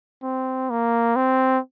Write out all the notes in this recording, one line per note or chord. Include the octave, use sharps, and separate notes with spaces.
C4
A#3
C4